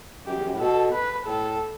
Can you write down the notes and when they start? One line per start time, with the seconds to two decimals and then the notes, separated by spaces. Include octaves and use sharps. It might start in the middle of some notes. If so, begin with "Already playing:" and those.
0.26 F#2 G4
0.35 E2
0.43 F#2
0.52 A2
0.60 B2 A4
0.93 B4
1.26 A2 A4